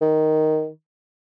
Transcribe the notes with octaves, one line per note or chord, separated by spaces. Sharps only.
D#3